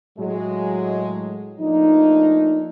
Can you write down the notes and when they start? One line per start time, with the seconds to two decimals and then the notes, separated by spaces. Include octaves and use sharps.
0.18 A2 F#3 G#3
1.60 F3 A3 A#3 D4 D#4